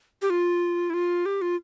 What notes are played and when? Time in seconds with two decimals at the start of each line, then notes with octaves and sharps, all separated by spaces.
0.22 G4
0.30 F4
0.90 E4
0.94 F4
1.26 G4
1.42 F4